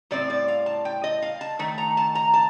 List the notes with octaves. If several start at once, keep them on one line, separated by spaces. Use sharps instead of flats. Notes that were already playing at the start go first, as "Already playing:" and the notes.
A2 G3 C4 D5
D5
F5
A5
G5
D#5
F5
A5
D#3 A3
A#5
A5
A#5
A5